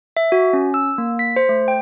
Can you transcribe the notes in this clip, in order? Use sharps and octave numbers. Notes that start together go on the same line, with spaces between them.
E5
F#4
C#4
E6
A#3
B6
C5
A3
G5